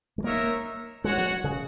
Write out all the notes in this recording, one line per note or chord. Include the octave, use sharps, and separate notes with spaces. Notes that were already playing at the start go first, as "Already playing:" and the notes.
G#3
A#3 D#4 A#4 C#5 E5
G#3 F#4 C#5 F#5
F#3
C#3